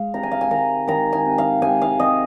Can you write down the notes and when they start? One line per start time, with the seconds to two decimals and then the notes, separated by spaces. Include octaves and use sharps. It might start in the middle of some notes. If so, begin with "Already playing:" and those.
Already playing: G#3 F5
0.14 C3 A#5
0.23 G#5
0.31 F5
0.41 G#5
0.51 D#3 A#5
0.88 D#3 A#5
1.13 G#5
1.26 C3
1.38 F5
1.62 C3 G#5
1.82 F5
2.00 C3 D#5